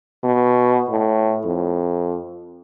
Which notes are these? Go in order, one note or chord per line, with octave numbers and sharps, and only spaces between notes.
B2
A2
F2